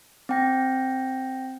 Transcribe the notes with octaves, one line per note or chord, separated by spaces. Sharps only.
C4 G5 A#6